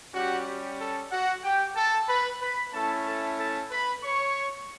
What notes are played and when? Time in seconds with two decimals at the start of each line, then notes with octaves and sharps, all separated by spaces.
0.14 G3 C#4 F#4 G4 F#5
0.47 G4
0.80 A4
1.11 F#4 F#5
1.44 G4 G5
1.76 A4 A5
2.09 B4 B5
2.41 B4 B5
2.73 A3 C#4 E4 A4 A5
3.06 A4 A5
3.38 A4 A5
3.71 B4 B5
4.03 C#5 C#6